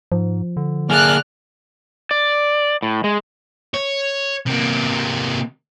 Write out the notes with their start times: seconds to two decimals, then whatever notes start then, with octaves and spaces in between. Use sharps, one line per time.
0.12 G#2 F3
0.57 D3
0.90 A#3 G#4 D5 F6 F#6
2.11 D5
2.83 A2
3.04 G#3
3.74 C#5
4.47 C3 A#3